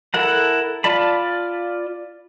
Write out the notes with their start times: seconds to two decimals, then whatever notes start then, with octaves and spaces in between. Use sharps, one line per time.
0.14 E4 A4 A#4 F#5 A#5
0.84 F4 D5 A5 B5